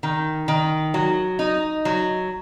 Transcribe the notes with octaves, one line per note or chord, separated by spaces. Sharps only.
D#3
D#3
F#3
D#4
F#3